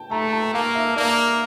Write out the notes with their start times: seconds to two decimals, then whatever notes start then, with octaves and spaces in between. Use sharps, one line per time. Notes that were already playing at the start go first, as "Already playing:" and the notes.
Already playing: G5 A5
0.11 A3 A#5
0.33 A5
0.54 A#3 F5
0.75 E5
0.96 A#3 D5